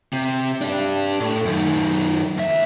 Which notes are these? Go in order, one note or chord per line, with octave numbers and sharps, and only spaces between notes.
C3
D4 G4
A2
F#2 D#3
D2 E5